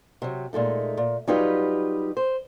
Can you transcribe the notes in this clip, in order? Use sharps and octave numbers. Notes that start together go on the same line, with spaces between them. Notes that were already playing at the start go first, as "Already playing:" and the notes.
C3 F#3
A#2 G#3 A3 D#4
A#2
F#3 G3 D#4 F4 G4 B4
C5